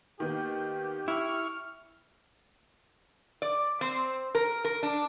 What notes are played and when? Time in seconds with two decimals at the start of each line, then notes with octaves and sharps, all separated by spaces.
0.20 D#3 A#3 B3 G4
1.08 E4 C#6 F6
3.42 D5
3.81 C4
4.35 A#4
4.65 A#4
4.83 D4